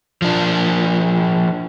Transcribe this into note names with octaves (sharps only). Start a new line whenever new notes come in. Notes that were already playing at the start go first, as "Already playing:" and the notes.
F3 D4